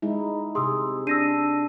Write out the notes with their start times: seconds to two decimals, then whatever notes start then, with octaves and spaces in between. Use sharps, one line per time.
0.02 G#3 D#4 E4
0.55 C3 G#4 C6 D#6 E6
1.07 D4 E6 A#6 D#7